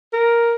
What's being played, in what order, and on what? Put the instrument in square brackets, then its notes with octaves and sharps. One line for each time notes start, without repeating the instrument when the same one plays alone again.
[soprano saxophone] A#4